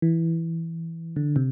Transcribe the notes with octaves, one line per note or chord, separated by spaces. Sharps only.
E3
D3
C3